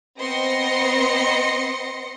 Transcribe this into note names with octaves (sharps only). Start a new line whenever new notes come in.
B3 C4 D#5 C6 A#6 C#7